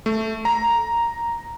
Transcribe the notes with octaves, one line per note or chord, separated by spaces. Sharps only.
A3
A#5